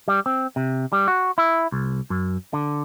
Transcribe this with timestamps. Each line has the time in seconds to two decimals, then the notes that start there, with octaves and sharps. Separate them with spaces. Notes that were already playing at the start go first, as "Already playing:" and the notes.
0.08 G3
0.26 C4
0.56 C3
0.93 G3
1.08 F#4
1.38 E4
1.72 C2
2.10 F#2
2.53 D3